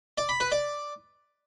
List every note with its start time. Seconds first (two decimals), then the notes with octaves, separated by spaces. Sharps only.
0.18 D5
0.29 B5
0.40 B4
0.52 D5